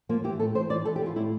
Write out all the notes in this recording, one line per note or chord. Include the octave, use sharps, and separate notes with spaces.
F3 A#3
E3 G4
A2 A4
E3 C5
E3 D5
E3 A4
G4
E3 F4
A2 E4